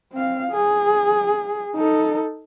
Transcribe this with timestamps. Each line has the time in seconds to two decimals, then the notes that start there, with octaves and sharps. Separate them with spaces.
0.13 C4 F5
0.52 G#4
1.76 D#4 A4